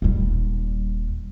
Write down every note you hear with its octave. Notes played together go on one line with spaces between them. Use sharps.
D#1 G3